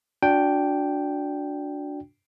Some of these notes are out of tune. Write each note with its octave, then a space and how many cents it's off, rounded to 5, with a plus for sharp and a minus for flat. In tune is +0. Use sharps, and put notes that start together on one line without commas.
D4 -10 F#4 -25 G5 +0